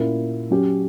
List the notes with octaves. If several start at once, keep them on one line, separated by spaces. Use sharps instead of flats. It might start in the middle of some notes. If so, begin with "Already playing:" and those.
Already playing: A#2 A#3 C#4 E4
F#3 C#4 G4